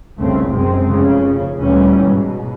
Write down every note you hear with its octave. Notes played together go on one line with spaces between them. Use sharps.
F1 C2 C#3 A3 C4
F#2 C3 G#3 C4
F1 C#3
D2 A#2 E3 G3 C#4
G#2 B2